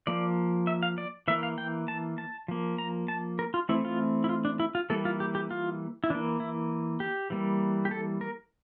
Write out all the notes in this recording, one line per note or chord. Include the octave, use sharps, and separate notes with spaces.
F3 A#3 D5
E5
F5
D5
E3 A#3 E5
F5
G5
A5
A5
F3 A#3
A#5
A5
A#4
F4
E3 A3 C4 E4
F4
E4
F4
D4
E4
F4
E3 G3 A#3 A4
F4
G4
G4
F4
E4
E3 A#3 D4
E4
G4
E3 G3 A#3
G4
A4
A#4